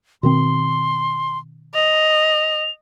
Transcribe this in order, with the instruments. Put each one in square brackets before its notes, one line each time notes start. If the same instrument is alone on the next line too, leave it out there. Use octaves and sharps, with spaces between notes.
[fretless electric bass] B2 D#3 C4 [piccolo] C6
[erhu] D#5 [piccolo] F7